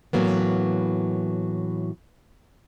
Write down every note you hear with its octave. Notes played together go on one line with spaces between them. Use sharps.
A2 E3 F#3 A#3 B3